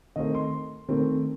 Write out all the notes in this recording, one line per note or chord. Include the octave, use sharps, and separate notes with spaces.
D#3 A3 C4 D#5
C6
D#3 A3 C4